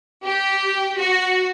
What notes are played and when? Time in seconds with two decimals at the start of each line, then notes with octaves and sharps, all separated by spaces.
0.24 G4
0.98 F#4